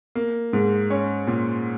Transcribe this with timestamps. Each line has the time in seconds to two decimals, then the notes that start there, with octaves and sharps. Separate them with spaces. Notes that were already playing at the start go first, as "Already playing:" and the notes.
0.15 A#3
0.53 G#2
0.90 C#4
1.27 A#2